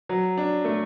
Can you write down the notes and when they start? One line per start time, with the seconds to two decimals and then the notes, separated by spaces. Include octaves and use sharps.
0.09 F#3
0.37 D4
0.65 A3